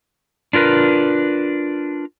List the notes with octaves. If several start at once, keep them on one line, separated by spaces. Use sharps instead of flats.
D4 F4 A#4 B4